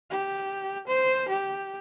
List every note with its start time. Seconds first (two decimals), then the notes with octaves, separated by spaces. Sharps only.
0.10 G4
0.88 C5
1.28 G4